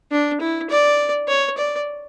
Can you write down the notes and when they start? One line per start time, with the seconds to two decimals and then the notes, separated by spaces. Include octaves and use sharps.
0.11 D4
0.40 E4
0.70 D5
1.28 C#5
1.57 D5